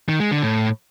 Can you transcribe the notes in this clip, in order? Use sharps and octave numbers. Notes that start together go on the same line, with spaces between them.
D#3
G#3
D3
A2